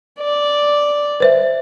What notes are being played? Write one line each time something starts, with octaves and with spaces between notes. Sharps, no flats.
D5
B4 C5 E5